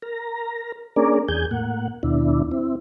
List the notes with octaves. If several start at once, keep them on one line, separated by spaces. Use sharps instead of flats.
A#4 A#5
A#3 C#4 D4 G#4 A#4 D5
E2 G#4 G#5 G6
A2 A#3 F#5
D#2 B2 D4 E4
C4 E4